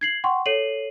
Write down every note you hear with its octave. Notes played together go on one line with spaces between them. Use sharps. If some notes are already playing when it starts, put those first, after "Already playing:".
G#6 C7 F#7
F#5 G5 C6 C#6
A4 C#5 C7 D#7 F#7